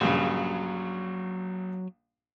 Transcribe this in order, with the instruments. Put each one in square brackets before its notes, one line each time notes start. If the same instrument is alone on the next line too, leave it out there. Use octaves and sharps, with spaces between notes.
[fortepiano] A#1 G2 C#3 [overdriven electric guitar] F#3